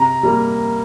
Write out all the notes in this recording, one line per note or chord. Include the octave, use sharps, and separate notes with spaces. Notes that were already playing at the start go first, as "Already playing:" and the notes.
Already playing: C3 A#5
G3 A#3